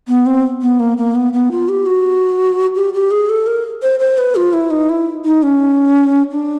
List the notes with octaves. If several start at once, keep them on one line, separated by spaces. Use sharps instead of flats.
B3
C4
B3
A#3
A#3
B3
B3
F4
G4
F#4
G4
G4
G#4
A4
A#4
C5
C5
B4
F4
E4
D#4
E4
D#4
C#4
D4